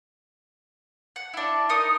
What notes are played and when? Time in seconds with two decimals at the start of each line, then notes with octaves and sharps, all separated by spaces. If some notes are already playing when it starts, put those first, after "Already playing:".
1.16 F#5
1.34 D4 E4
1.69 D#4 A#4 D#6